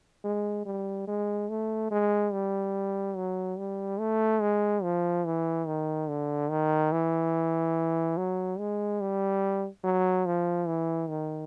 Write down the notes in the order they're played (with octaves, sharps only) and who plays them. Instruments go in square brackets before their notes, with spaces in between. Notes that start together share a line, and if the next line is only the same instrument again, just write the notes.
[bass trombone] G#3
G3
G#3
A3
G#3
G3
F#3
G3
A3
G#3
F3
E3
D#3
D3
D#3
E3
F#3
G#3
G3
F#3
F3
E3
D#3